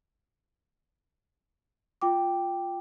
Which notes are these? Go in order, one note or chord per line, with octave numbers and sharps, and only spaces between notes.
F4 G5 D6